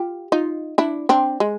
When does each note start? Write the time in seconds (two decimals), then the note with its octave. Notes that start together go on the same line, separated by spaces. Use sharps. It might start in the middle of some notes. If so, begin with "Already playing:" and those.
Already playing: F4 G4
0.32 D#4 F4
0.78 D4 E4
1.09 C4 D4
1.40 G#3